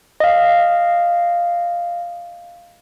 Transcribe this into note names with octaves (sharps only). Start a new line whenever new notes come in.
D#5 F5